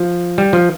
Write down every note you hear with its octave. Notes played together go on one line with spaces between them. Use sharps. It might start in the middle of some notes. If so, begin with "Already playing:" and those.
Already playing: F3
G3
F3